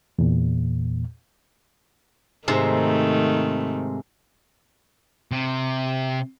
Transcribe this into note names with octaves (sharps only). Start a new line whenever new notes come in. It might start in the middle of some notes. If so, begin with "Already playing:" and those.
E2 A#2
G#2 C3 D#3 A3
C3